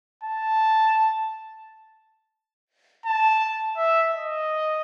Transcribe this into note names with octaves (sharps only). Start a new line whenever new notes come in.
A5
A5
E5
D#5